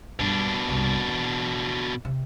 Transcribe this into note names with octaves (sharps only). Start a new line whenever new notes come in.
G2 B2 D4
C2 G2
E3
C3